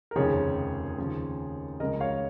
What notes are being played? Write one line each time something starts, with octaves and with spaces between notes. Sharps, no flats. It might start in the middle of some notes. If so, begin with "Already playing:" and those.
A#4
F1 D#2 C#3 F3 G#4 C#5
D#2 C#3 F3
C#2 C#3 F3 A#4 D#5
C#5 F5